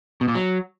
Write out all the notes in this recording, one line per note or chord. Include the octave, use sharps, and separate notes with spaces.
B2
A#2
F#3